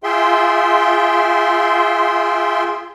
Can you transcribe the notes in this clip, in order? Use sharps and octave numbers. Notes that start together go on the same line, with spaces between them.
F4 G#4 E5 G5 C6